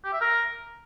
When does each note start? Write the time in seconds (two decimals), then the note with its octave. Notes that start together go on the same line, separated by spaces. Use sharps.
0.04 G4
0.13 E5
0.21 A#4